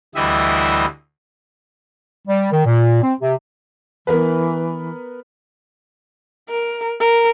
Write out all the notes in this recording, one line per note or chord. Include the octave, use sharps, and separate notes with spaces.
D2 E3 G3 E4 D#5 E5
G3
D#3
A#2
C4
C3
E3 B3 A#4 B4
A#4
A#4